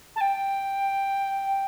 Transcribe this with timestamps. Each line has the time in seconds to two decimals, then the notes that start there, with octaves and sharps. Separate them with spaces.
0.16 A5
0.21 G5